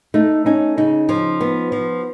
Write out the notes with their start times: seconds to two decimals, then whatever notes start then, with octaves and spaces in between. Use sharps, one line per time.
0.14 A3 D#4
0.46 C#4 D#4
0.78 C#3 D#4
1.09 F3
1.41 B3
1.72 F3